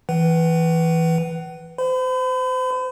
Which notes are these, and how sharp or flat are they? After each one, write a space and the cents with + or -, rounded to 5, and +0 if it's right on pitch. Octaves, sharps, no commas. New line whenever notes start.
E3 +0 B4 +0 F#5 +35
C5 -30 B5 +40